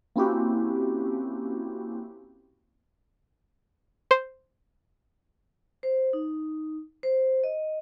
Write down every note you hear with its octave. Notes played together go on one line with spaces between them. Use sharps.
A#3 C4 C#4 E4 F#4 G4
C5
C5
D#4
C5
D#5